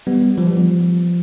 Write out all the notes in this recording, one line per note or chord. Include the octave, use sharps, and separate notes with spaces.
G3 B3
F3
G3
F3